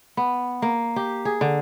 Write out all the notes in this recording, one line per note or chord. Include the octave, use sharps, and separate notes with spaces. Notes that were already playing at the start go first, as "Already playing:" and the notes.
B3
A#3
G4
G#4
D3